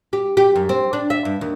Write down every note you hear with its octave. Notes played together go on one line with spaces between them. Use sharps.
G4
G4
F#2
C4
D4
E5
G2
D#2